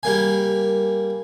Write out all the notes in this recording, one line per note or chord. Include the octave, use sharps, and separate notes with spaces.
G3 A#3 G#5